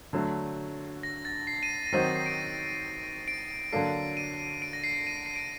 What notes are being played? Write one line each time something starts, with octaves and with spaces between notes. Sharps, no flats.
D3 F#3 A3
A#6
A6
C7
D#7
A#6
D#3 F#3 C4 D#4 F#4 C7
A#6
C7
D7
D7
D3 F#3 A#3 D4 A4 C7
D#7
D7
A#6
C7
D#7
D7
C7
D7